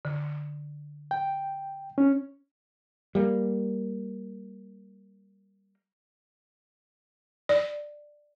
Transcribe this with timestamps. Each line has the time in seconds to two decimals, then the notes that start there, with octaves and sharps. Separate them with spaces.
0.05 D3
1.11 G5
1.98 C#4
3.15 G3 A#3
7.49 D5